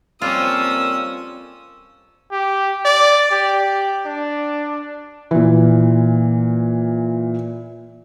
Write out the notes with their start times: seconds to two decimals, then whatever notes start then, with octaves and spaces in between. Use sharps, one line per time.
0.22 F2 G3 A#3 C#4 F4 D#6 E6
2.32 G4
2.85 D5
3.31 G4
4.06 D4
5.31 A#2 E3